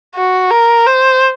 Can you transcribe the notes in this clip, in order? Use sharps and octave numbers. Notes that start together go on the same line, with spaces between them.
F#4
A#4
C5